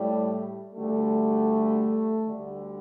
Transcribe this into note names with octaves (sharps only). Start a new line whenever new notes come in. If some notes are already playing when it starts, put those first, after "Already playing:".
Already playing: A2 G3 A3
D2 D3 G3 A3
D2 D3 G3